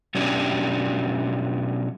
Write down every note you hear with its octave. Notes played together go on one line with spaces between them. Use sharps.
B2 F#3 C#4 D4 G4